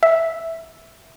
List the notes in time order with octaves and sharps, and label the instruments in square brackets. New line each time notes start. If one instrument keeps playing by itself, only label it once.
[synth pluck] E5